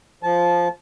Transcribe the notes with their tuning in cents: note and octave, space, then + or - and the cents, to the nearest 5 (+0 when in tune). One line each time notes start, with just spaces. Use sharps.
F3 +0 A5 -20